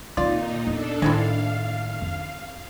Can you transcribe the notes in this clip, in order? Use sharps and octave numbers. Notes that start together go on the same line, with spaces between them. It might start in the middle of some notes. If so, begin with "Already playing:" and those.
A#2 D#3 C4 D#4 F4 D5
E2 D4 A4
A2 D#3 G#3 C4 E4 F5
F2